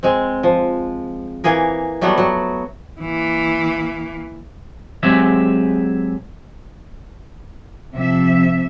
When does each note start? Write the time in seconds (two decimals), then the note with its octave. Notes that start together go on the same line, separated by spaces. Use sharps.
0.03 G#3 C4
0.43 F3
1.44 E3 A#3 G#4 A#4
2.01 F#3 G3 A3 B3
2.18 F#3
3.01 E3 A#3
5.03 F#3 G#3 C4 G4 G#4 E5
7.94 C3 F3 E5